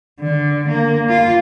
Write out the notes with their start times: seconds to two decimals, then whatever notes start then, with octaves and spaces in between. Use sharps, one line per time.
0.21 D3
0.68 A#3
1.09 F4